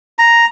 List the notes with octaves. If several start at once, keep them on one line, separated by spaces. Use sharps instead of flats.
A#5